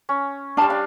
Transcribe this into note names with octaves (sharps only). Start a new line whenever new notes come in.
C#4
G3 D4 F5 A5
D4 F5